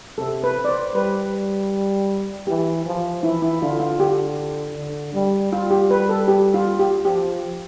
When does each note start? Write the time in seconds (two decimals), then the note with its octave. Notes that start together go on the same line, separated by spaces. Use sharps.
0.18 C3 A4
0.44 B4
0.65 D5
0.69 C5
0.95 G3 B4
2.47 E3 G4
2.85 F3
3.23 E3 E4
3.42 E4
3.61 D3 F4
3.80 F4
3.99 D3 G4
4.75 D3
5.14 G3
5.53 G3 F4
5.71 G4
5.91 B4
6.09 A4
6.28 G4
6.54 F4
6.79 G4
7.04 F3 G4